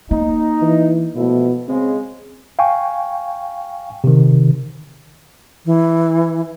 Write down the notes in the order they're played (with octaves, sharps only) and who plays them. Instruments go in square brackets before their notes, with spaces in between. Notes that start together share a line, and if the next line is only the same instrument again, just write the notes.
[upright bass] A#3 [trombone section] D#4
[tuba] E3
[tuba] B2 [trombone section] F3 A3 E4
[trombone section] C#3 G#3 [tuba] C4
[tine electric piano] F5 G5 G#5 C#6
C3 D#3
[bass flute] E3